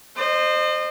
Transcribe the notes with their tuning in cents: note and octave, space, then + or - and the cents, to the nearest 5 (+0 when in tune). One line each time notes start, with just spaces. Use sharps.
C5 +0 D#5 -35